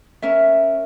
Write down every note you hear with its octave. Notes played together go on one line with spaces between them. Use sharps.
C#4 A#4 E5